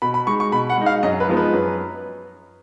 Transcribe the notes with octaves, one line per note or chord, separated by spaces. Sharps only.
B2 B5
B5
G#3 D#4 C#6
C#6
B2 B5
F#5
G#3 D#4
F5
F#2 D#5
B4
F3 G#3 B3 D#4
B4
F#2